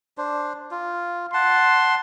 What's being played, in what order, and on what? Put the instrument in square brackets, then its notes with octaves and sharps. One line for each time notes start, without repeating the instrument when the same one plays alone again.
[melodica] D4 C5
F4
[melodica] F#5 A5 [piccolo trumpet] C6